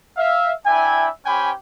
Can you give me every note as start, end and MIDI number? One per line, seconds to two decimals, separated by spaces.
0.17 0.52 76
0.17 0.52 77
0.66 1.07 62
0.66 1.07 64
0.66 1.07 76
0.66 1.07 79
0.66 1.07 80
1.26 1.52 61
1.26 1.52 67
1.26 1.52 72
1.26 1.52 79
1.26 1.52 80
1.26 1.52 83